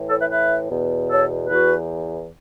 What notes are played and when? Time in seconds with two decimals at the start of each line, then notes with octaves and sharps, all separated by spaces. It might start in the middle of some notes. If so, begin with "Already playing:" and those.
Already playing: A2 E3
0.10 A4 C#5
0.20 B4 E5
0.30 B4 E5
0.69 E2 B2
1.10 A4 C#5
1.49 E2 E3 F#4 B4